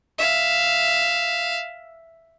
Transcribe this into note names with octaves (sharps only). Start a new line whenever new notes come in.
E5 F5